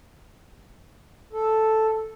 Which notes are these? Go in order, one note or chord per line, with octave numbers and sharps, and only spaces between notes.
A4